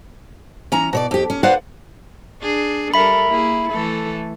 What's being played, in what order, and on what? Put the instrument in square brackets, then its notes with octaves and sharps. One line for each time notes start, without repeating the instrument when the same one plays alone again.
[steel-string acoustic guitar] E3 C#4 A#5
B2 C#5 D5
F2 G4
C#4
B4 C5 D5 F5 F#5
[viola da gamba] D4 G#4
[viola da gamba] G3 A4 A#4 [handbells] E5 B5
[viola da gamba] A#3 E4 G#4
E3 A3 A4